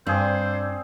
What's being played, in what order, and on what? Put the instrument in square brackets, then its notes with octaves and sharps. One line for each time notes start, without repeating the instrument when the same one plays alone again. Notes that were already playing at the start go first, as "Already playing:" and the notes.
[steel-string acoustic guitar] G2 D4 [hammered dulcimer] C4 G#4 D5 [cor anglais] C5